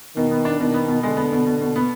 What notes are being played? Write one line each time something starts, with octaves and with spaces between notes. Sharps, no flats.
B2 D#3
B3
D4
B2 D#3
B3
B2
D3 G#3
B3
B2
B2
B2
B3